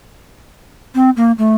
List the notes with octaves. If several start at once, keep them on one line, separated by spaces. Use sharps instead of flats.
C4
A#3
A3